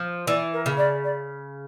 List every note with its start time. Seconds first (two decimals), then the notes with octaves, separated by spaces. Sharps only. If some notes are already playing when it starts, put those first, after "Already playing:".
Already playing: F3
0.27 E3 D5
0.53 A#4
0.66 C#3
0.77 D5
1.04 D5